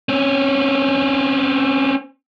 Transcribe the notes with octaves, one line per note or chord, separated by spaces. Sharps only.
C4 C#4